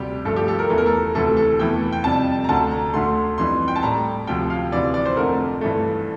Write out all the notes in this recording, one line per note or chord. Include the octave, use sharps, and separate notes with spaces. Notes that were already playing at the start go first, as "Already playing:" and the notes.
Already playing: D2 C3 G3 G4
G2 F3 A3 A4
G4
A4
A#4
E2 E3 A3 A4
A#4
A4
D2 C3 E3 A3 A4
A4
E2 E3 A3 G5
G5
F2 C3 G3 A5
A#5
D2 D3 A3 A5
A#5
D2 D3 A3 C6
F2 E3 G3 C6
G5
A5
A2 G3 A#5
D2 C3 F3 G5
F5
D2 C3 E3 D5
D5
C5
F2 D3 A3 A#4
G2 E3 A3